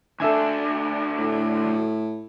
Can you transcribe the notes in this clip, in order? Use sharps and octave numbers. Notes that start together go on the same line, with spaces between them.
D2 D4 A4 E5 G#5
A2